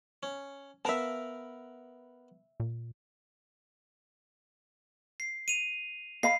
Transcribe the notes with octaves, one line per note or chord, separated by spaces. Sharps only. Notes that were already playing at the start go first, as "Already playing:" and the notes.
C#4
B3 A#4 E5 F5 A5
A#2
C7
D#7 F7
D#5 F5 B5 C7